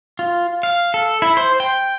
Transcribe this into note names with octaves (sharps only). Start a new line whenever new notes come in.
F4
F5
A4
E4
C5
G5